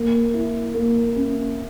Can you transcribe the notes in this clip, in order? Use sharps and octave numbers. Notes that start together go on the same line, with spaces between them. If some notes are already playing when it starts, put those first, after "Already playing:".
Already playing: A#3
E4
A#3
C#4